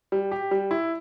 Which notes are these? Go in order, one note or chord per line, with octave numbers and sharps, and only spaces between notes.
G3
G4
G3
E4